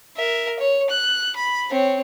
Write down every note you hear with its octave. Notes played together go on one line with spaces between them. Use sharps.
A#4 E5
C#5
F#6
B5
C4 C#5